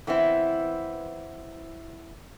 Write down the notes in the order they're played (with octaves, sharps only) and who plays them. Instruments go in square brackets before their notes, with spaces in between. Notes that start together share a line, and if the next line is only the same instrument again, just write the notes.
[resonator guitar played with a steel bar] E3 B3 C4 E4